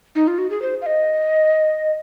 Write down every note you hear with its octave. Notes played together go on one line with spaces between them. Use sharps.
D#4
F4
F#4
G#4
C5
F5
D#5